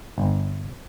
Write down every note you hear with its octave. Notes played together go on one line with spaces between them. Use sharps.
G1